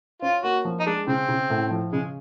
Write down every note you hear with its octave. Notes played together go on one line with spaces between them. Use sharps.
C#4 F4
A#3 F#4
F3
D#4
G#3 D4
C#3 C4
C#3
A2
F3
C#3 G#3